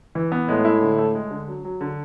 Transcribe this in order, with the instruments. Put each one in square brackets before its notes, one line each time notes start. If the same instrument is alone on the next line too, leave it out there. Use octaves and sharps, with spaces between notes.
[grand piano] E3
B3
[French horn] A2 [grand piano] G#3
[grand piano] E4
D3
A3
G#3
D3
F#3
F#3
D3